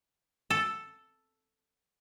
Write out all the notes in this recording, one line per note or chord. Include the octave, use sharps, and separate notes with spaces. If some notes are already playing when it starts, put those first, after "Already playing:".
A4